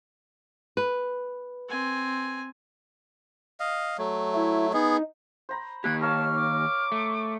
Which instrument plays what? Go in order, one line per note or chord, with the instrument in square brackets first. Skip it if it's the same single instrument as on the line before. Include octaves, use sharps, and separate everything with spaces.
[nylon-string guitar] B4
[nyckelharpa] C4 G#5
[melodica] D#5 F5
F#3 A3
[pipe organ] E4
[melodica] B3 G#4 [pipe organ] D#4
[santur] C5 A#5 B5
[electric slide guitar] D#3 A#3 G4 [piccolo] F#6 [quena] G#6
[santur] A#4 C#5 F5 [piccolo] A5 [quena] F6
[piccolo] D6
[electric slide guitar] A3